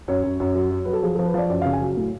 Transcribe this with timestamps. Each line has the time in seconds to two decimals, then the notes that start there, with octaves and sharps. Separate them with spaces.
0.08 F#2 C#5
0.24 F#2
0.40 F#2
0.55 F#3
0.71 F#3
0.85 F#3 B4
0.93 A4
1.02 F3 G#4
1.15 F3 A4
1.26 B4
1.34 F3 D5
1.50 F#2 D5
1.62 C#3 F5
1.73 G#5
1.81 F#3
1.97 A2